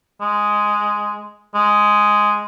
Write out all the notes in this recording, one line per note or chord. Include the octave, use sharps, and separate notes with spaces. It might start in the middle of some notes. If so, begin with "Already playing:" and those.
G#3
G#3